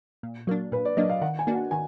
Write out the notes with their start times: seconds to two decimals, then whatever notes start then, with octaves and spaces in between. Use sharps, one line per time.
0.23 A#2
0.47 F#3 A#3 D4
0.72 A#2 B4
0.85 D5
0.97 F#3 A#3 D4 D#5
1.09 F5
1.22 D#3 F#5
1.39 G#5
1.47 A#3 D4 F#4
1.55 F#5
1.71 D#3 G#5